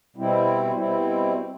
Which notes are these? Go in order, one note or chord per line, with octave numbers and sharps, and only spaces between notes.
B2 G3 C4 E4
B2 G3 C4 E4